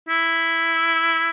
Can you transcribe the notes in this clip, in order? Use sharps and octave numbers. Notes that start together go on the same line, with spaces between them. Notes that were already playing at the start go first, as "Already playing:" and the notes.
E4